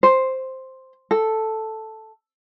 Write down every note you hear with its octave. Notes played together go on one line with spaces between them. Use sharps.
C5
A4